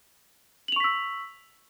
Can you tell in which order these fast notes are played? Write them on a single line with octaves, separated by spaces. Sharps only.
F#7 F7 C#6 B6 E6